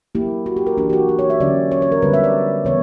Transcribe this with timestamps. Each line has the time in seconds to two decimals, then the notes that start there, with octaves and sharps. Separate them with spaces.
0.15 F#3 A#3 E4 G4
0.46 F#4
0.56 G4
0.67 A#4
0.77 E3 A#3 D4 G4
0.90 G4
0.93 F#4
1.09 G4
1.19 C#5
1.30 E5
1.40 D3 F#3 C#4 D5
1.72 C#5
1.82 C#5
1.92 A#4
2.02 D3 G3 B3 B4
2.13 E5
2.24 D5
2.65 C#3 E3 B3 C#5